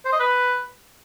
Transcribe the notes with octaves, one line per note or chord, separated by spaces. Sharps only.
C5
D#5
B4